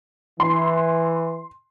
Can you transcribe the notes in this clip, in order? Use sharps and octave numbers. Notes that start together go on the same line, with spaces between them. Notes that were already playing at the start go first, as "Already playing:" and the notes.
E3 C6